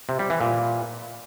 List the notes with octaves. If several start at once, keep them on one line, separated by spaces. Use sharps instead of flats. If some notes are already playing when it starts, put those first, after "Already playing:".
C3
G3
E3
A#2